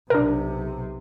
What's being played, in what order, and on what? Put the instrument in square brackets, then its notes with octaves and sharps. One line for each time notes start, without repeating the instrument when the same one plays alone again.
[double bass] B1 C3 [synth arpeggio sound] D4 A#4